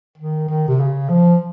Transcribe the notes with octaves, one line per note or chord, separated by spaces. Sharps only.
D#3
D#3
C3
C#3
F3